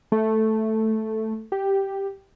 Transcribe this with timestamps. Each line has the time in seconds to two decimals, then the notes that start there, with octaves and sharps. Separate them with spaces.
0.12 A3
1.52 G4